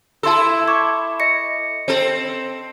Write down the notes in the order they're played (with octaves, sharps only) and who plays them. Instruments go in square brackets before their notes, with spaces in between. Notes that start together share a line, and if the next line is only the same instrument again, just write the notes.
[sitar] E4 A4 [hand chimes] A5 C6 E6
[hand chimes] C#6 D6 G#6
D#5 A#6 C#7
[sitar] C4 A4